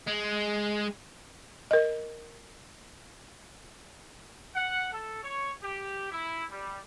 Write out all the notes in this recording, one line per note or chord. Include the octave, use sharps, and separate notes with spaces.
G#3
A#4 D#5
F#5
A4
C#5
G4
E4
G3